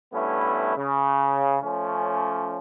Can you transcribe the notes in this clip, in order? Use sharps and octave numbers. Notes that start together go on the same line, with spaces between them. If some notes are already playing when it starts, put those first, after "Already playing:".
G2 A3 B3 C#4 E4
C#3
F3 A3 C#4